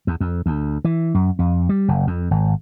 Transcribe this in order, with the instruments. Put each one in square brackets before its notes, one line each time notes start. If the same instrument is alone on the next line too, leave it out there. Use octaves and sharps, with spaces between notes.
[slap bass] E2
F2
D2
E3
F#2
F2
G3
F#1
F2
G#1